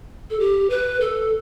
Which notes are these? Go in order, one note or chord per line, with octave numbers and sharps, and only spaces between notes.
A4
G4
B4
A4